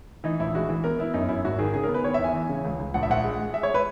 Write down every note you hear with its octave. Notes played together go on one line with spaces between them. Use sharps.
E3 D#4
A#1 E4
G#3 F#4
E3
B3 A#4
B3 E4
F#2 D#4
F#2 E4
G#1 F#4
D#3 G#4
C#3 G#4
A#4
B3
B4
D#3 C#5
E5
E2
G#5
E3
C#3
C#2
C#2
A#1 F#5
E5
A#1 F#5
G#3
G#3
G#3 E5
C#5
B4